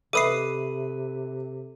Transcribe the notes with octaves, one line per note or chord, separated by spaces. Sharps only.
C3 A4 B4 E5 D6 D#6 C7 D#7